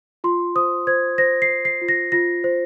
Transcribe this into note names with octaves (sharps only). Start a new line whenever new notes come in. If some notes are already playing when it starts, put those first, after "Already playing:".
F4 C6
C5 D#6
C5 G#6
C5 A#6
C7
C5
C7
F4
A#6
F4 A#6
C5